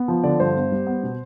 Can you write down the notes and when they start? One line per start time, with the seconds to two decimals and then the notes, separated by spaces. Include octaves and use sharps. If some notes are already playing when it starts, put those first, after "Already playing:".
Already playing: B3
0.08 F3
0.23 D3 D5
0.40 G2 C5
0.56 B3
0.72 G3
0.87 B3
1.03 B2